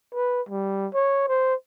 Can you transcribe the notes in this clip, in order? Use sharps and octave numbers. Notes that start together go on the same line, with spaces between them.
B4
G3
C#5
C5